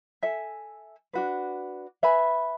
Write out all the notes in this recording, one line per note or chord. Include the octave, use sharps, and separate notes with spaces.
A4 E5 G#5
D4 F#4 B4
B4 E5 G#5 B5